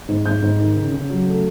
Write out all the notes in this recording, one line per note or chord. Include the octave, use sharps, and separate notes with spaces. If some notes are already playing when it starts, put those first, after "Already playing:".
G#2
G#2 G6
G#2
D#3
C#3
C#3
F#3
A3